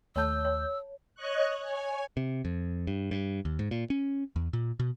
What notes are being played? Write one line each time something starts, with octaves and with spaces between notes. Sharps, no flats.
D#2 A3 C#5 A5 E6 G6
C#5
C#5 D#5 C#6 F#6
C#5 G#5
C3
F2
G2
G2
D#2
G#2
A#2
C#4
E2
A#2
B2